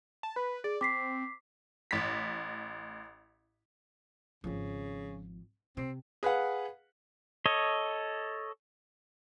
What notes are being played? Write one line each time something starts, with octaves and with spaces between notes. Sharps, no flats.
A5
B4 B5
G#4 D5
C4 D6 B6 C7
A1 B6
G#1 C#3 F3
C3 C4
G#4 B4 F5 F#5
A4 C#5 D#5